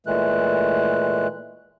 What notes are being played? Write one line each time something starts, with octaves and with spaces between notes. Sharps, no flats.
A#2 E3 G#3 A3 F#6